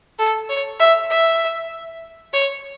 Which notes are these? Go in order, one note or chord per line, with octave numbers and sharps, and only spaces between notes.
A4
C#5
E5
E5
C#5